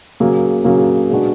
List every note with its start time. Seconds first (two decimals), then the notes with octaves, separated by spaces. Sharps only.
0.20 C#3 F#3 A#3
0.64 C#3 F#3 A#3
1.10 B2 G#3 B3 D4 F#4